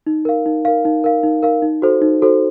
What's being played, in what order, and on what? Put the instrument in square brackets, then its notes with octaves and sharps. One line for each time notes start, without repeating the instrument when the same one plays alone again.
[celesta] D#4
A#4 F5
D#4
A#4 F5
D#4
A#4 F5
D#4
A#4 F5
D#4
F#4 A4 C5
D#4
F#4 A4 C5